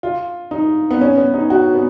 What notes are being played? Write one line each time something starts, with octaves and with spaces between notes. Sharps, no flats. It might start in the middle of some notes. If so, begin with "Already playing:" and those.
F4
D#4
B3
C#4
B3
D#4
F#4
B3